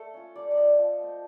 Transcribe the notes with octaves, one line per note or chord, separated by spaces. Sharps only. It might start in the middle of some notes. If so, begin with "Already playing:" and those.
Already playing: A3 A4
C#4 F4
G3 D5
D5
C4 F4 D#5
F3
A3 C4